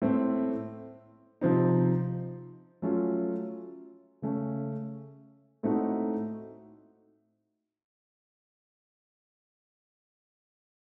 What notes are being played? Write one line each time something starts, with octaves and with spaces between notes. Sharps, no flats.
A2 A3 C4
C3 F3 C4 D#4
F#3 A3 C#4 F4
C#3 A3 C#4
A2 A3 C4 D#4 F#4